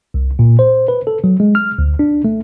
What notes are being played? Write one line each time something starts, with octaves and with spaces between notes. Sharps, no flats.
C2
A#2
C5
B4
A4
F#3
G#3
F6
D2
D4
A3